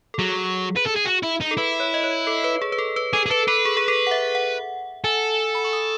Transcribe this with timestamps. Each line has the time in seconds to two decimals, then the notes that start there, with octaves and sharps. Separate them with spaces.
0.14 A4
0.19 F#3 G#4
0.76 B4
0.86 A4
0.96 G#4
1.05 F#4
1.23 E4
1.41 D#4
1.51 A4
1.57 E4 B4
1.80 C#5
1.94 D#5
2.04 C#5
2.27 A4
2.44 B4
2.62 G#4
2.72 B4
2.78 A4
2.96 B4
3.13 G#4 A4
3.26 G#4
3.31 A4 B4
3.48 A4 B4
3.65 G#4
3.77 G#4
3.88 A4
4.07 F#5
4.11 E5
4.35 F#5
5.04 A4 G#5
5.55 B5
5.65 C#6
5.73 D#6